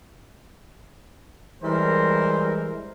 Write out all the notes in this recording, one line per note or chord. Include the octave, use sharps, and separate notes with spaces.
E3 G3 G#3 A#4 C5